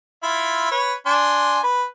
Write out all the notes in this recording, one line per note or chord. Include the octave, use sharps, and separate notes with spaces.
E4 F4
B4 C#5
D4 G#5 C6
B4